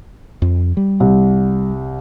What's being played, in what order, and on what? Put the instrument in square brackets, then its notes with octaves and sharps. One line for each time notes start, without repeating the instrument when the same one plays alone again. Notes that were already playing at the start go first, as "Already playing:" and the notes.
[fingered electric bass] F2
G3
[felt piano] C2